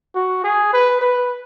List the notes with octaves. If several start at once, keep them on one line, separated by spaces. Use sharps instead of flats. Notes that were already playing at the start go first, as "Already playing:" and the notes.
F#4
G#4
B4
B4